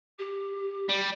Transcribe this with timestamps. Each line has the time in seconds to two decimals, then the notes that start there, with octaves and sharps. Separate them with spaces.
0.19 G4
0.89 G3